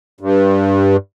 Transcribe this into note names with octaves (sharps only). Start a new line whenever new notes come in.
G2